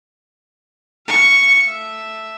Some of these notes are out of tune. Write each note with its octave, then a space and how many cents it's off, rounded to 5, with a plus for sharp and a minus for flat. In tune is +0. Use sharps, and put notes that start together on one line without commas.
F5 +0 C#6 +0
A3 +0 E5 +0